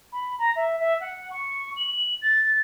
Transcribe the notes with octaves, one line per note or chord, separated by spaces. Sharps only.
B5
A#5
E5
E5
F#5
C#6
F#7
A6